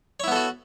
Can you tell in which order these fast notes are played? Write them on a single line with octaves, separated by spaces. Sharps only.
C#5 E4 B3 A4 F#4